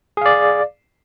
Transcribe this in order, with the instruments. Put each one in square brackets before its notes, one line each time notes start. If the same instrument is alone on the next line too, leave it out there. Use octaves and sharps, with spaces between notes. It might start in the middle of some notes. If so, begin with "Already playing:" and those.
[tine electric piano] G#4
F5
D5